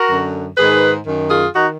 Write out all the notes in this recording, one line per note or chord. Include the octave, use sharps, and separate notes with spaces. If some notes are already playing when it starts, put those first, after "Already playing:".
Already playing: F#4 A#4
F#2 D3
G#2 D#3 G#4 B4
F#2 D#3
F4 G#4
D#3 D#4 F#4